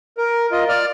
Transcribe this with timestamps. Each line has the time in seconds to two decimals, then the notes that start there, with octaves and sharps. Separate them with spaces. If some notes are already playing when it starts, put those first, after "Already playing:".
0.18 A#4
0.52 F4 D#5
0.69 D5 F6